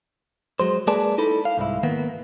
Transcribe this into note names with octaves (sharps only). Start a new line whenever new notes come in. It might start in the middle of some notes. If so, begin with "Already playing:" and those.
F#3 G#3 C5
G#3 A#3 G#4 B4 D5 A5
D#4 E4 A4 B5
F5
C2 G#2 E4
D#3 A#3 B3